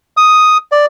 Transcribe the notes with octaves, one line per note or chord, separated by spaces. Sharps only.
D#6
D5